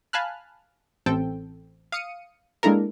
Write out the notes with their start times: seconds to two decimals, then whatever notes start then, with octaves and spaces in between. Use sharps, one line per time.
0.13 F5 G#5 A5 B5 F6 F#6
1.06 A1 C4 A4 G5
1.92 F5 D#6 C#7 D#7
2.63 G#3 A#3 D4 E4 A4 A#4